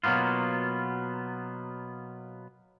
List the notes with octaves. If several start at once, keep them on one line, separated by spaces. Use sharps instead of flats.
B2 F#3 A#3 B3 F4